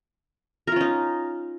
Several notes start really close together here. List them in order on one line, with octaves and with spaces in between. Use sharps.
A#4 F4 C#4 D#4